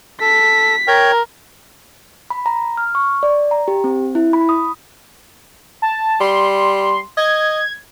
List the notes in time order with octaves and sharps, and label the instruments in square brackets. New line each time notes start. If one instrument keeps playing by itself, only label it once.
[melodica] A4 [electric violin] B6
[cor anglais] A#4 [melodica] C#5 G5 A#5
[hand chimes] B5
A#5
F6
C#6
D5
A#5
G4
C4
E4
B5
D#6
[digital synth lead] A5
[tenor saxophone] G3 [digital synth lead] C6
[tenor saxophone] D#5 [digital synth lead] G#6